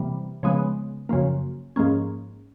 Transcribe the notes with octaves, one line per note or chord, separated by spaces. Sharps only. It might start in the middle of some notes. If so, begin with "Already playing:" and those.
Already playing: C3 E3 G3 A#3
C#3 F3 G#3 B3
F#2 C#3 F3 A#3
G#2 F3 A#3 C#4